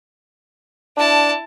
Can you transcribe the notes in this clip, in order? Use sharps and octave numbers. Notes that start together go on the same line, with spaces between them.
D4 E4 A5